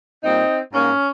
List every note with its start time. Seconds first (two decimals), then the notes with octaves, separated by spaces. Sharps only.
0.23 A#2 G3 A#3 C4 D#4
0.73 G#2 G3 A#3 C#4